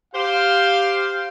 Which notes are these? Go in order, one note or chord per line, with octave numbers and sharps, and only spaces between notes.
G4 C5 F5